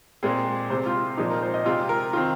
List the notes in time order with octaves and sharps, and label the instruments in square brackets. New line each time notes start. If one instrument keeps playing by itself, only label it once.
[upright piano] A#2 G#3 C4 G#4
C3 G#3 C4 C5
F4
F4
A#2 F3 G#3 C4 D#4
A#4
C5
D#5
C3 G#3 C4 F4
A#4
D#3 C4 F4